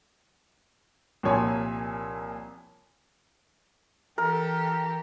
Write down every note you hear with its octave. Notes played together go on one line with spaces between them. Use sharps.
C2 A#2 F3 C#5 G#5
E3 G4 A4 A#4